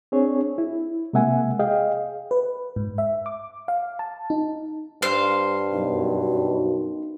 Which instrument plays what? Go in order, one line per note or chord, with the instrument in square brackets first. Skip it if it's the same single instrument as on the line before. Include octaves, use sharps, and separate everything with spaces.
[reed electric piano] C4 D4 G#4 C#5
E4
C3 G#3 A#3 E5 F#5 G#5
G#4 D#5 F5 G5
[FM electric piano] B4
G#2
E5
D6
F5
A5
D#4
[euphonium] G2 [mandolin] C5 F5
[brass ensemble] F#2 B2 [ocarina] D#4